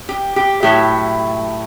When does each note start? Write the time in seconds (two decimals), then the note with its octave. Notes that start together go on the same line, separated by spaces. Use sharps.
0.09 G4
0.36 G4
0.63 A2 F#3 A3 E4 G4